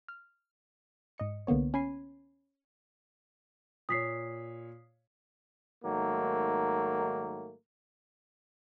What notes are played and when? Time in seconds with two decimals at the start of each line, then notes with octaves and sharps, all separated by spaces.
0.08 F6
1.18 G#2 D#5 C#7
1.47 C2 D3 A#3 B3 C#5
1.74 C#4 G#5 B5 G#6 C7 D#7
3.89 A#2 C#5 D#6 B6 C7
5.85 G#2 D#3 F#3 A3 A#3